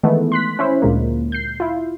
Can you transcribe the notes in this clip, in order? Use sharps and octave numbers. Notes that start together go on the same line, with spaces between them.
D#3 E3 G#3 A3 B3
C6 F#6 B6
C#4 E4 C5
D2 A#2 G#3 A#3
G6 C7
E4 F4